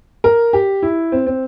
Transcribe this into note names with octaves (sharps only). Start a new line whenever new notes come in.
A#4
G4
E4
C4
C4